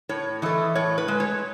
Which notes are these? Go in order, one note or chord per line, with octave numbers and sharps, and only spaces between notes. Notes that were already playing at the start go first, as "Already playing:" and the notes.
A2 C#5
E3 A3 D#5
A2 C#5
B4
G#3
C#5